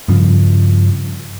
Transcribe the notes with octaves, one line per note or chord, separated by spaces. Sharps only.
G2 C#3 F3